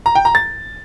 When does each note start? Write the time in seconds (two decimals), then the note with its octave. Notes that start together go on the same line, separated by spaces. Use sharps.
0.06 A#5
0.15 G5
0.25 A#5
0.35 A6